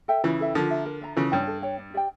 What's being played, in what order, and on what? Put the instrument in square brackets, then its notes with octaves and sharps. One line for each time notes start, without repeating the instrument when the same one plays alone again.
[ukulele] A4 E5 G5
[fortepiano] C#3 E3 [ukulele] E4
[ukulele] A4 E5 G5
[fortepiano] D3 F3 [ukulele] A#4
[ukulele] E5 A#5
A#4
E5 A#5
[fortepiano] C#3 E3 [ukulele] A4
[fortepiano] G2 [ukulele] C#5 G5
[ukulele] A4
C#5 G5
D4
G4 D5 G5